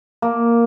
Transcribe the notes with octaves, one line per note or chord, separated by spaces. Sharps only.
A#3